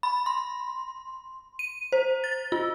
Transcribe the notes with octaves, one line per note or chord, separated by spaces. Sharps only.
B5
C6
D#7
C5
A6
F4